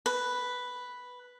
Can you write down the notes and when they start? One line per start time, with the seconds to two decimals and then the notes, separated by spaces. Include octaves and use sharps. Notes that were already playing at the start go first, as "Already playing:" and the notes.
0.06 B4